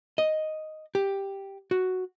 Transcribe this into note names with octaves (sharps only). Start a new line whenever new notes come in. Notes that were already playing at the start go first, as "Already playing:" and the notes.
D#5
G4
F#4